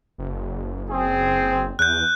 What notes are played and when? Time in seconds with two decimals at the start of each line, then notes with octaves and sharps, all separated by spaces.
0.18 F#1
0.91 C4 G#4
1.79 E2 F#6 G6